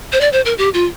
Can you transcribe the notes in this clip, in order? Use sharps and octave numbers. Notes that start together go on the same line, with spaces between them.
C5
D5
C5
A#4
G4
F4